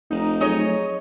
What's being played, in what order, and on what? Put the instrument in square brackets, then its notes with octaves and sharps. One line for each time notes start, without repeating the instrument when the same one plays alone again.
[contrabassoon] F1 [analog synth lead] D#4
[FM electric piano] F#3 A3 G#4 [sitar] C#5 D#5